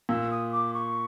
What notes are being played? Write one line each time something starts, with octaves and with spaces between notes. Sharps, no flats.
A#2 E6
D#6
D6
C#6